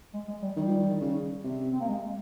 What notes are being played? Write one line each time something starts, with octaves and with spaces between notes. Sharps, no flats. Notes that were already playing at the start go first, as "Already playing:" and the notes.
G#3
G#3
G3
D#3 G3
F3
D#3
D#3
C#3
C3
C4
A#3
G#3